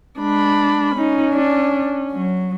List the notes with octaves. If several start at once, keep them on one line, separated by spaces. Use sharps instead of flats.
G#3 D4 B5
C#4 D#4
D4
F#3